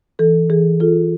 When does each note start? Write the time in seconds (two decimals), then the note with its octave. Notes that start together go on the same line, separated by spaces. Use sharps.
0.19 E3 A4
0.50 E3 G#4
0.80 F4 A4